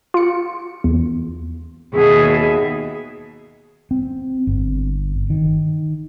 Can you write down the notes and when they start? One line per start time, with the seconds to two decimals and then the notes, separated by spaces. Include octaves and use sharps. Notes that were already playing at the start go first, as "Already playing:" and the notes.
0.14 F4 C#7
0.84 E2
1.93 D#2 B2 G#4 E5
3.91 C4
4.47 G1
5.30 D#3